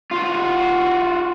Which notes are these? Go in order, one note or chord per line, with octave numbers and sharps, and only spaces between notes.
F4 F#4